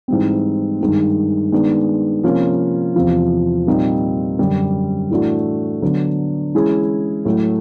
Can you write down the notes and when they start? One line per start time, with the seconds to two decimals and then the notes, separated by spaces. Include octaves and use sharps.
0.08 G#2 E3 G3 C4
0.81 G2 D#3 G#3
1.52 D#3 G#3 B3 D4
2.24 C3 F3 A#3 C#4 F4
2.96 E2 C3 F3
3.67 A#2 G3 C4 D#4
4.39 F#2 D3 G3
5.10 A2 E3 A3 D4 F#4
5.82 D3 F#3 B3 D4
6.55 E3 G#3 C#4 E4 G#4
7.25 A2 F#3 A3